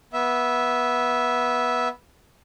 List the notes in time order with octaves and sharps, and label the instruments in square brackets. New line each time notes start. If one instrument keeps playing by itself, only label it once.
[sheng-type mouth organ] B3 E5